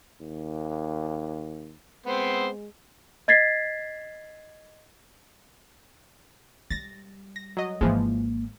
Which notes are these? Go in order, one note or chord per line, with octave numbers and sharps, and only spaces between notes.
D#2
G#3 B3 C4 C5
D#5 G#6 A6 B6 C7
G3 A6 A#6
A#6
F#3 D#5
G#1 E3 F3 G#3 A#3